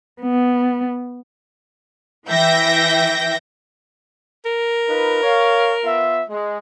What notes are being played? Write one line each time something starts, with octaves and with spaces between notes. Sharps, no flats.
B3
E3 E5 G5 G6 A#6
A#4
D#4 F4 B4
C#5 F5
B3 F4 E5
G#3